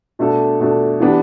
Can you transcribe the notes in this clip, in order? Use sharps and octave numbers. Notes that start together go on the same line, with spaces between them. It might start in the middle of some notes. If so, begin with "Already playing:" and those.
B2 A3 D4 A4
B2 A3 D4 A4
E3 B3 D4 G4